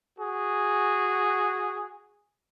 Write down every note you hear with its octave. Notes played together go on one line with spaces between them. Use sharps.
F#4 G#4